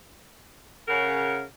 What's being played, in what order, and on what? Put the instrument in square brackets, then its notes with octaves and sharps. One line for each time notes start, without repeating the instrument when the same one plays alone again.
[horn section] C#3 A#4 F#5